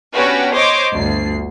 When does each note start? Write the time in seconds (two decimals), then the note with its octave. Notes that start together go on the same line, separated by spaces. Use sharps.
0.14 B3 C#4 D4 F#4 G4 B4
0.54 C5 C#5 D#5 C6 D6
0.94 G1 D2 C7